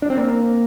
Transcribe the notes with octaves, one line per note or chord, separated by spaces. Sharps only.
D4
C4
A#3